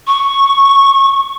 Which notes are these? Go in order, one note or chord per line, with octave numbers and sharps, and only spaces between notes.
C#6